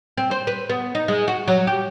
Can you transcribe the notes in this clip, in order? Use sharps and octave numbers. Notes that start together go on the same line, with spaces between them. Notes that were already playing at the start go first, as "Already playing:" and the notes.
C4
C5
B4
B3
D#4
G#3
F#4
F#3
G4